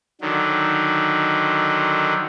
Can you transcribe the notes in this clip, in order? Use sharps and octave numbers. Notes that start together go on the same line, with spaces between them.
D3 D#3 F#3